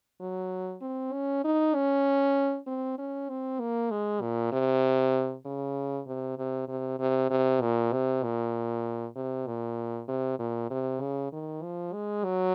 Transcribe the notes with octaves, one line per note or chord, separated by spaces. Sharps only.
F#3
C4
C#4
D#4
C#4
C4
C#4
C4
A#3
G#3
A#2
C3
C#3
C3
C3
C3
C3
C3
A#2
C3
A#2
C3
A#2
C3
A#2
C3
C#3
D#3
F3
G#3
F#3